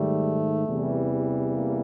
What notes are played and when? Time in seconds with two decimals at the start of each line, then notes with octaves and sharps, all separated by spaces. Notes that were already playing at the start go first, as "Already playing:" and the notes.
Already playing: G#2 D#3 G3 A3
0.65 E2 C3 E3 G3
1.53 A#3